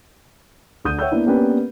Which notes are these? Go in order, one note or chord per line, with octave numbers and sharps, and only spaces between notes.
D2 D3 D#6 G6 D#7
C#5 E5 F#5 G5 E6 G6
A#3 B3 D4 E4
A#3 B3 C#4 D4 G4 B4